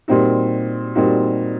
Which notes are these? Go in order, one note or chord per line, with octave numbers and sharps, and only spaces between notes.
A#2 G3 C4 D#4 F#4
A#2 G3 C4 D#4 F#4